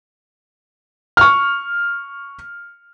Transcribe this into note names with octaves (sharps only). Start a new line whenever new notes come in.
C#6 F6